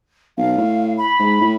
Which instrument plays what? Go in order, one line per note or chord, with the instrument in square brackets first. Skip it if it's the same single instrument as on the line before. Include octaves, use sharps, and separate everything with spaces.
[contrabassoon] B1 [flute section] F5
[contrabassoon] A2
[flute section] B5
[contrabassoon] G#2
A2